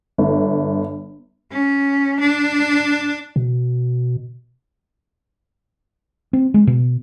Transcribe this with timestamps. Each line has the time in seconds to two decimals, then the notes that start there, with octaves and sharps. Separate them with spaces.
0.18 G1
1.51 C#4
2.19 D4
3.36 B2
6.33 C4
6.54 G#3
6.67 B2